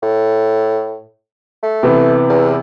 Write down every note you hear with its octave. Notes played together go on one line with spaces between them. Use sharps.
A2
A3
C3 E3 B3
E2